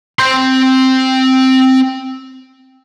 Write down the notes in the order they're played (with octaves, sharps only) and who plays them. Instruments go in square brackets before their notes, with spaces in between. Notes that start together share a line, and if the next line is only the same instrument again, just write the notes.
[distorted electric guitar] C4 C6